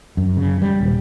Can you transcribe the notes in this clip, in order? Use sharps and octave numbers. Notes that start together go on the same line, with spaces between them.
F#2
C#3
G3
D#1